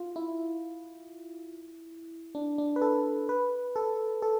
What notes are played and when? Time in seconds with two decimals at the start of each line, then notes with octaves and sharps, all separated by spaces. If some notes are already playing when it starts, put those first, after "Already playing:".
Already playing: F4
0.16 E4
2.35 D4
2.58 D4
2.76 B4
2.82 A4
3.29 B4
3.76 A4
4.22 A4